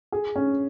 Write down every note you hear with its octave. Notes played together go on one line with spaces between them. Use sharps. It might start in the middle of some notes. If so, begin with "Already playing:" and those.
G#4
C#4